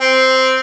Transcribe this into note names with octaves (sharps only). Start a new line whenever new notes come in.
C4